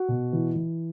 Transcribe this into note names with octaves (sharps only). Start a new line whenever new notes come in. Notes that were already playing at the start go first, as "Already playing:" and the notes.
Already playing: F#4
B2
E3
E3